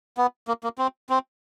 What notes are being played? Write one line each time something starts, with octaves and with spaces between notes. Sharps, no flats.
B3
A#3
A#3
C4
C4